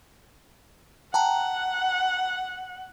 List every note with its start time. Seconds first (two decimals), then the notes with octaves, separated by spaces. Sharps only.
1.14 F#5 G5 A5 A#5